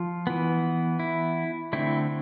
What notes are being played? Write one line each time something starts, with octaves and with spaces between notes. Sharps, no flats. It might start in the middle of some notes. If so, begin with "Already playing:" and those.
Already playing: F3 F4
E3 B3
E4
D3 A3 C4 E4